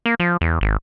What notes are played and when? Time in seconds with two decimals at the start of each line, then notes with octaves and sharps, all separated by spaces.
0.06 A#3
0.20 F3
0.41 E2
0.61 G#1